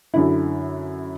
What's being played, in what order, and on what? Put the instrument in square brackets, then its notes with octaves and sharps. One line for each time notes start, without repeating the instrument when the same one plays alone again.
[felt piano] F#2 D3 E4